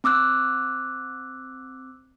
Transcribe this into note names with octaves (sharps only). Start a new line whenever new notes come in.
C4 D6 E6 F#6